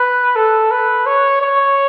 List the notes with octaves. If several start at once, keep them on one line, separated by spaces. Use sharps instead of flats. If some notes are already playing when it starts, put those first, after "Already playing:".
Already playing: B4
A4
B4
C#5
C#5